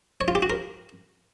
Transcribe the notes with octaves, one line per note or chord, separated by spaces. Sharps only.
C#5
F4
G4
F#4
A#4